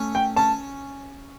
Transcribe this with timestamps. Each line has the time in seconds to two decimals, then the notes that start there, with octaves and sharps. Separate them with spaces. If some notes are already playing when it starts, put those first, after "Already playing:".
Already playing: A3 C#4
0.15 G5
0.36 C#4 A5